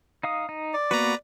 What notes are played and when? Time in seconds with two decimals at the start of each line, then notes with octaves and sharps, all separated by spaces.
0.23 D#4 F5 D#6
0.49 D#4
0.74 D5
0.91 A#3 B3 F#4 B4 A#5